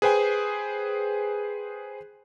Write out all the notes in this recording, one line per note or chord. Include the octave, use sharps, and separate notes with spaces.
G#4 B4 C5 G5 G#5